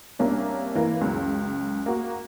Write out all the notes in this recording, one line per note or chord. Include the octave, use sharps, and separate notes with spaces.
C2 A#3 C#4 D4
E3 A#3
C#2 F#2
A#3 F#4